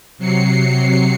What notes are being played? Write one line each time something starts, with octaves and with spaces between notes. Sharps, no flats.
C3 F#3 C7 C#7